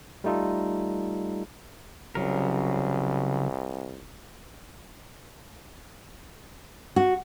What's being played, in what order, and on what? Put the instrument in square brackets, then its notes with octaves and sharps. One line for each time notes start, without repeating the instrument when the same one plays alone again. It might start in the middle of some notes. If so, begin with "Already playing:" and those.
[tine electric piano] G3 A3 D#4 F4 A4
[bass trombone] C2 [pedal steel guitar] C#3 F#3 A#4
[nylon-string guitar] F#4